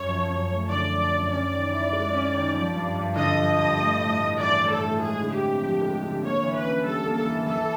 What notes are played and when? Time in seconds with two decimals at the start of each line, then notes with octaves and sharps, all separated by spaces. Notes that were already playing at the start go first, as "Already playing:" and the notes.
Already playing: F#2 C#5
0.08 F3
0.30 F#2
0.50 A3
0.70 D3 D5
0.90 F3
1.11 F#2
1.31 C#4 D5
1.52 D#3
1.72 E4
1.93 G#3
2.14 C#4
2.34 D#3
2.54 F3
2.75 G2
2.95 G2
3.16 D3 D#5
3.36 F3
3.56 G2
3.77 A3
3.98 A2
4.18 A2
4.38 E3 D5
4.59 A3
4.69 A4
4.80 A2
5.00 G#3 G#4
5.21 D3
5.30 G4
5.41 C4
5.61 F3
5.82 G#3
6.03 D3
6.22 A#3 C#5
6.43 E3
6.54 B4
6.64 C#4
6.84 G3 A4
7.04 A#3
7.14 A4
7.25 E3
7.46 E3 A4